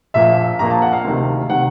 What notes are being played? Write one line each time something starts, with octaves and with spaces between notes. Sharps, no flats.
A#1 A#2 F3 A#3 E5
A#1 A#2 F3 A#3 A#5
A5
F#5
F5
D2 C3 D#3
C3 D#3 F#5